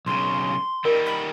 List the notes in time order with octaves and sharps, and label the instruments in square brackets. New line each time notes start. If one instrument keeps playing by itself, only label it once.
[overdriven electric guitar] B1 C#3 [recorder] C6
[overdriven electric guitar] D#3 G3 [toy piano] A#4
[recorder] B5